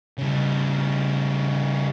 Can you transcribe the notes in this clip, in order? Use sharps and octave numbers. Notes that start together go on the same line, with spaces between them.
C#3 G3